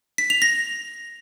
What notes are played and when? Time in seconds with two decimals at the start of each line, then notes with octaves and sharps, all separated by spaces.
0.18 B6
0.30 F7
0.42 A#6